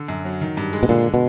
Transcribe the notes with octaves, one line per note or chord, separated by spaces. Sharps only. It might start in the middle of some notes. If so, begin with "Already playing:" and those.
Already playing: D3
F#2
F#3
D#3
G2
G#3
B2
A#2 D3
B2